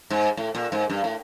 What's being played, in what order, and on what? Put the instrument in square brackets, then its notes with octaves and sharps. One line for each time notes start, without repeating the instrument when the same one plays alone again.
[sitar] G#2
A2
A#2
G#2
G2
A2